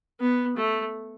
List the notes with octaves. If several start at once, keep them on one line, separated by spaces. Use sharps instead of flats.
B3
A3